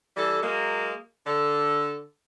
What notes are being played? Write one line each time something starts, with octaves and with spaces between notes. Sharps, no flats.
E3 G3 A4
F#3 G#3 A#3
D3 A4